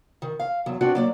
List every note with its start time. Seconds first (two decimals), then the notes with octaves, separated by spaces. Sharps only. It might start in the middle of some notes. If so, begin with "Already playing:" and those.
0.22 D#3
0.40 F5
0.66 E2 F#3
0.81 B3 C4 D4 F#4 D5
0.95 F#3 A#3 D5